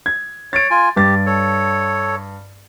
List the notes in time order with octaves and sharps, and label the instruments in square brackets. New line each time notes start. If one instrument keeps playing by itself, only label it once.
[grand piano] G#6
[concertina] C#5 [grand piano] A6 D7
[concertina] F4 G#5
[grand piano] G2 A6 [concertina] G4
[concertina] A4 C#5